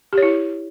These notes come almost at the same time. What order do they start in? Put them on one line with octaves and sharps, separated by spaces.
G4 C#5 E4